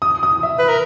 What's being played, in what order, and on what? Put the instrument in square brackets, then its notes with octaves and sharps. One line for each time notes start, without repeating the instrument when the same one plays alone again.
[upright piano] D#6
D#6
E5
[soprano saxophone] B4
A#4